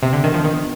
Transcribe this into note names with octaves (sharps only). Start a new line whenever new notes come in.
C3 B3
D3
D#3 D4
F3
D#3 B3